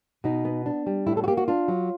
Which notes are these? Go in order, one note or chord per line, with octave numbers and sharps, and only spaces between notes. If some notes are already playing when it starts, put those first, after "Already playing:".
B2 D#4
B3
D4
G3
A2 E4
A4
F#4
A#3 G4
F#4
D4 F4
F#3